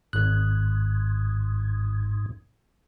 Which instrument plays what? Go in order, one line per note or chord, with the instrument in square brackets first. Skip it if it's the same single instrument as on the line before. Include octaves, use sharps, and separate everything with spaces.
[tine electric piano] G#1 F#6 [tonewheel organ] G#2